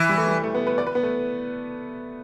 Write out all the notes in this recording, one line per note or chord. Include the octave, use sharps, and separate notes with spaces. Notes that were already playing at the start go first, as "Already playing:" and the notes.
Already playing: E3
G3
A3
G3
A3
B3
B4
D5
B4
B3
A3